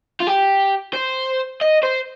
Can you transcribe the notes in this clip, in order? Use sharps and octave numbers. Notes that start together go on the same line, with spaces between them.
F4
G4
C5
D#5
C5